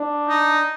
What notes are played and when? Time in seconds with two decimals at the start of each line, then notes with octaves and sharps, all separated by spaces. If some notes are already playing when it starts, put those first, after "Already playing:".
Already playing: D4
0.28 D#4